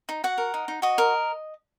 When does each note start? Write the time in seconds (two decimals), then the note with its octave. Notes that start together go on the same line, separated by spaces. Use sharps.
0.09 D#4
0.24 F#4 F#5
0.38 A#4
0.54 D#4
0.68 D#4
0.82 F#4 D#5
0.98 A#4